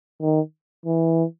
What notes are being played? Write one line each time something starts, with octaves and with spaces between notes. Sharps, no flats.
D#3
E3